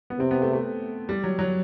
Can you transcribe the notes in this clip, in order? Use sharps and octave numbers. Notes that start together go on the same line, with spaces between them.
B3
C3 C4
B3
A3
A3
G3
F#3
F#3